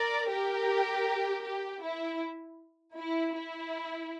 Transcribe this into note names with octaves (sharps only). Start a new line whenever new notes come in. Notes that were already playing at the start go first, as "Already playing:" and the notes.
Already playing: A#4 D5
G4 A#4
G4
E4
E4
E4